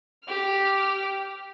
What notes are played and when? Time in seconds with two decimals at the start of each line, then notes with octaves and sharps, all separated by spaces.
0.25 G4 F6